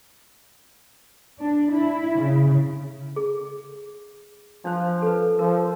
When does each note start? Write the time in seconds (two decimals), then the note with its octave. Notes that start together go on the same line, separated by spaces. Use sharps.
1.40 D4
1.72 E4
2.19 C#3
3.16 G#4
4.65 F3 D4 C5
5.02 A4 B4
5.39 F3 A#4